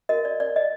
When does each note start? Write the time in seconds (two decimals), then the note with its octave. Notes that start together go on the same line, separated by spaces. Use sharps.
0.09 F#4 A#4 D#5
0.25 D5
0.40 D5
0.56 D#5